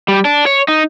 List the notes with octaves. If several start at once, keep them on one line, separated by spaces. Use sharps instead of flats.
G3
D4
C#5
D#4